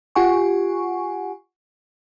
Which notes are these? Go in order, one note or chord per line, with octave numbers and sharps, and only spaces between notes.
F4 G4 F#5 G#5 C#6